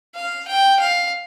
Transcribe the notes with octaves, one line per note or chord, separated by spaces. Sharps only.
F5
G5
F5